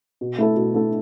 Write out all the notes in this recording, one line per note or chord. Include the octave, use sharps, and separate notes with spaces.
B2
A3 E4 A4
B2
A3 E4 A4